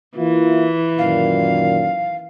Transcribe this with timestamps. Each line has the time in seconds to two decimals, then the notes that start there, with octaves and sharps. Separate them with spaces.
0.17 E3 A#3 E4 F4
0.98 F#2 A#2 D#3 F5